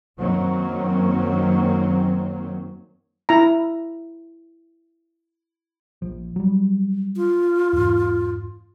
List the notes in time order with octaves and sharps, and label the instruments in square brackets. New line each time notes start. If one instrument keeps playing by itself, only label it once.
[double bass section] F#2 D#3 F#3 A#3 C4 C#4
[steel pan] E4 A#5
[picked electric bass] A#1 F3
F#3 G3
[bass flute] F4
[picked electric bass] E2 G#2